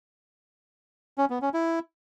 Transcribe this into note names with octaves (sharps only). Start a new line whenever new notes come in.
C#4
B3
C#4
E4